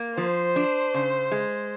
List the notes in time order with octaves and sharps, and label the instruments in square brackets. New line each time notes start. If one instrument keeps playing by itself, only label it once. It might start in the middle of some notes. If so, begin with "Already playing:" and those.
Already playing: [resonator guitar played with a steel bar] A#3
[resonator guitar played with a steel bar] F3 [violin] C5
[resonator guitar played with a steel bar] D4
C#3
G#3